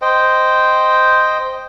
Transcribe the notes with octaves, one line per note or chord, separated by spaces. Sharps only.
C5 D#5 G5